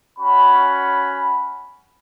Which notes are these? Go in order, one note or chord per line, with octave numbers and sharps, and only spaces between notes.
C#4 F#4 B5